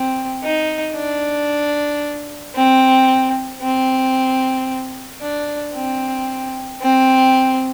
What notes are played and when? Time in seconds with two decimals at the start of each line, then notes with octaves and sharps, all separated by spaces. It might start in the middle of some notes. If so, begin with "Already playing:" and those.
Already playing: C4
0.43 D#4
0.96 D4
2.55 C4
3.61 C4
5.21 D4
5.74 C4
6.81 C4